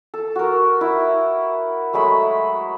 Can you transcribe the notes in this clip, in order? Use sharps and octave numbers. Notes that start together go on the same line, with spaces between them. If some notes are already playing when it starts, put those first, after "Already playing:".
A4
F#4 A#4
E4
F#3 G#3 A3 B5